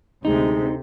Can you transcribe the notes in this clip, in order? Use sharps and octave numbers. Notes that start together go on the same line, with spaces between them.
D2 C3 G#3 D#4